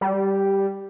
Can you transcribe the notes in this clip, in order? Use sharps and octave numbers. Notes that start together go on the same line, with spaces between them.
G3